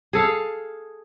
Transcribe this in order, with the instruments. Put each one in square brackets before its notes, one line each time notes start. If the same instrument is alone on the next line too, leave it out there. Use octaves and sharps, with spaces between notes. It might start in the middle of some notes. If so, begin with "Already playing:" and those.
[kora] G#4 A4 F5